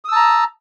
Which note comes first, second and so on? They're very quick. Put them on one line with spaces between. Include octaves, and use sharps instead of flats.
D#6 E6 A5 A#5